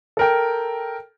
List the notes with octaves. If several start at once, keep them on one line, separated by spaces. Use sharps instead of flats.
A4 A#4 G5